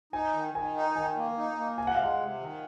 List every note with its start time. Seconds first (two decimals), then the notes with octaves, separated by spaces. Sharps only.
0.13 D#4 G#5
0.34 D#3
0.54 D#3 G#5
0.75 D#4
0.96 D#3 G#5
1.16 A#3
1.37 D#4
1.58 A#3
1.78 C3 G#5
1.87 F#5
1.95 F5
2.00 G#3 F#5
2.20 C3
2.41 D#3